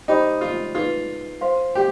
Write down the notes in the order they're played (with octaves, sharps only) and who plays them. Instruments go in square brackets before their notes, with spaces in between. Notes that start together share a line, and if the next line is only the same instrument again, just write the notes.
[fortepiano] D#4 [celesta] G4 C5 G5 B5 D6
[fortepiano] F4
[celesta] D#4 G#4 B4 [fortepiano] F4
[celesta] C5 F5 C6
[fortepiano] G4